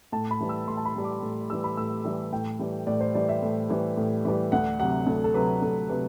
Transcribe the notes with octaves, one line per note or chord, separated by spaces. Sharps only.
A2 A5
B5
E3 G3
E6
A2 C6
A5
B5
E3 G3
D6
A2
E3 G3 E6
B5
A2 E6
E3 G3
A2 G5
E3 G3
A2 D5
C5
E3 G3 D5
E5
A2
E3 G3
A2
E3 G3
D2 F#5
C3 F#3 F#5
D2 A4
A4
C3 F#3 B4
D2 A4
C3 F#3 B4